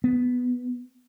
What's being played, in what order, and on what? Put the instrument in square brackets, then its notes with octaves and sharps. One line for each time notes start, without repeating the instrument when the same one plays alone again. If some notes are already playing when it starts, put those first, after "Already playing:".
[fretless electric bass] B3